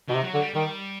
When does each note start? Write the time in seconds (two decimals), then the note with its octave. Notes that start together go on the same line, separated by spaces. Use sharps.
0.08 B2 D#3
0.14 C3
0.24 F#3
0.34 D3
0.40 G3
0.54 D#3 G3